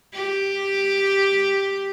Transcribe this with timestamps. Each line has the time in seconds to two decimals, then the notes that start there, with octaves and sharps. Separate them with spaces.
0.13 G4